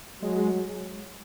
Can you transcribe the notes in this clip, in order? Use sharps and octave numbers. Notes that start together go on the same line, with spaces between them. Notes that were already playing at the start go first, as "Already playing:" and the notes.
F#3 G#3